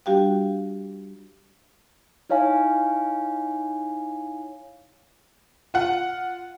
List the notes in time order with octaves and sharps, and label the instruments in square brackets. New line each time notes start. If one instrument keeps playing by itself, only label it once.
[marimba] G3 D4 F#4 G4 F5 G5
[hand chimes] D#4 E4 C#5 F5 G#5
[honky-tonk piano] F4 F#5